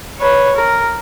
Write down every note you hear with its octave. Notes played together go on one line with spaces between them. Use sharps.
B4 C#5
A#4